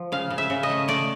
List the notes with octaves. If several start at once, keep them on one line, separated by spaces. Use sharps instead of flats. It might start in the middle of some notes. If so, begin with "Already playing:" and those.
Already playing: F3
C#3 F5
C#3
E5
C#3
D#5
A3
A3 D5